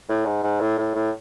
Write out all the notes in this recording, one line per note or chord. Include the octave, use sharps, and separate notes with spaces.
A2
G#2
G#2
A2
A2
A2